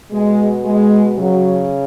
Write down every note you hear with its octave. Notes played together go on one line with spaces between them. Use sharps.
B2 G#3
G#3
C#3 F#3